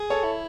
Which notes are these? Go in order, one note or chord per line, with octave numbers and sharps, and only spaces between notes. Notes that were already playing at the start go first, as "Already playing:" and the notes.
Already playing: G#4
A4 C#5
E4